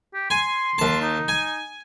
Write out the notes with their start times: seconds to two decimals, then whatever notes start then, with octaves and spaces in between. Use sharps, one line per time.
0.14 G4
0.30 G#5 C6
0.78 D#2 A5
1.02 D#4
1.28 G#5